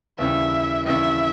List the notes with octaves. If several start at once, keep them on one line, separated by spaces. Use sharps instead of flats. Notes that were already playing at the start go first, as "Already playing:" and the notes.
D#2 C#3 E3 G3 E5
D#2 C#3 E3 G3 E5